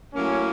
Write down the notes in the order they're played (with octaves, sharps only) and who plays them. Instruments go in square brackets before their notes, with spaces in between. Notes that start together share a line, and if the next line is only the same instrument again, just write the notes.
[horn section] A2 F#3 A#3 C#4